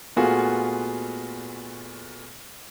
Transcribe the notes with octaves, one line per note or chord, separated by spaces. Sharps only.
A#2 A3 B3 F4 F#4 G#4